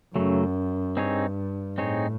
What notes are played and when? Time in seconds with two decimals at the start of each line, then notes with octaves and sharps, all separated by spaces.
0.16 F#2 C#3 F#3 A3
0.97 G2 C4 D#4 G#4 C#5
1.77 A2 C4 D#4 G#4 C#5